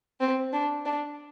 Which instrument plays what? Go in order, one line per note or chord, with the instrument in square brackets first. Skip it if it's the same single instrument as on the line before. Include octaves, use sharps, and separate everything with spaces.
[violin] C4
D4
D4